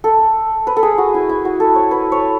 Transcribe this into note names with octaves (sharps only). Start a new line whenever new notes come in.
A4
B4
A4
G#4
F#4
E4
E4
F#4
A4
C#5
B4
C#5